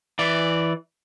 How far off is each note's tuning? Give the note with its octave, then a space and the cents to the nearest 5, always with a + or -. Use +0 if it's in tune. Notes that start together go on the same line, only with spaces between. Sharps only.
E3 +0 D5 +0